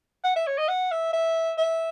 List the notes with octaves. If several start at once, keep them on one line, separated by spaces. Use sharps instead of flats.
F#5
E5
C#5
D#5
F#5
E5
E5
E5